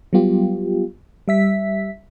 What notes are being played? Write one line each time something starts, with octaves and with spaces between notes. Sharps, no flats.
F#3 G3 B3 F4 G4
G3 E5 B6